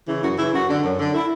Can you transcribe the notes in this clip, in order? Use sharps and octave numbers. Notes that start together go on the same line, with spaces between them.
C#3 E3
F#2 F#4
C#3 E3 E4
F#2 F#4
D3
F#2
D3
E4